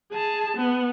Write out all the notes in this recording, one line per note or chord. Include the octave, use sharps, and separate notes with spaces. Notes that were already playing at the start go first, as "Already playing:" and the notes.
G#4 A5
B3